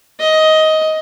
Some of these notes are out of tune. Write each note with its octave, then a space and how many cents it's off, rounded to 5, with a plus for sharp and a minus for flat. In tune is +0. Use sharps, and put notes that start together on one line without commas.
D#5 +15